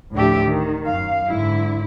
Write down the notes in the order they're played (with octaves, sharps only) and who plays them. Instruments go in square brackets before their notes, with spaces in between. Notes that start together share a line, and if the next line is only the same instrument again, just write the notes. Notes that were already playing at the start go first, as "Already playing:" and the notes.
[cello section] D2 A2 F3 D4 G4 E5
D#3
F#2 F5
G#2 D3 E4